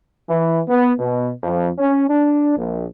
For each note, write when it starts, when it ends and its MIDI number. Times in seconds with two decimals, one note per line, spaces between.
0.29 0.60 52
0.68 0.92 59
0.99 1.31 47
1.43 1.69 41
1.79 2.08 61
2.09 2.55 62
2.56 2.84 34